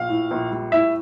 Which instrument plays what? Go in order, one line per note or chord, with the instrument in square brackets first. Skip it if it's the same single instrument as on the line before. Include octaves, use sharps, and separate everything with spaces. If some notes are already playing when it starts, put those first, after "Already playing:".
Already playing: [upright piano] A#1 F5
A2
A#1
G3
A2 E5